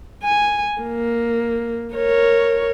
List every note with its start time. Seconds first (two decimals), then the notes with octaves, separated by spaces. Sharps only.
0.24 G#5
0.82 A#3
1.95 A#4 C#5